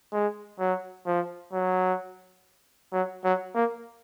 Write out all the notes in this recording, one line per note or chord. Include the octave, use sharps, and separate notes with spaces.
G#3
F#3
F3
F#3
F#3
F#3
A#3